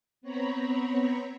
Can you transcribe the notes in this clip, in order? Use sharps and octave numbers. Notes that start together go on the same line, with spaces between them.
B3 C4 C#5 A#5 B5